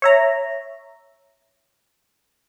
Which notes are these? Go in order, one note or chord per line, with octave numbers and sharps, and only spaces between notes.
C#5 E5 A#5